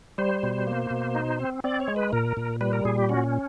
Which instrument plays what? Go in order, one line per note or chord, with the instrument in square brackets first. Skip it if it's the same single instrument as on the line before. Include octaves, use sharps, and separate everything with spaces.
[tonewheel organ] G3 C5
B2
A#3
B2
D#4
C4
C4 D5
C#5
G#3
B4
A#2 A#4
A#2
G3 B4
A#4
A#2 G#4
G4
C#4 F#4